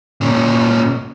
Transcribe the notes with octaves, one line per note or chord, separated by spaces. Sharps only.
A#2 C#4